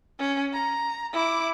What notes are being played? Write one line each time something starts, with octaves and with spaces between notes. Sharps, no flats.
C#4
A#5
E4 D6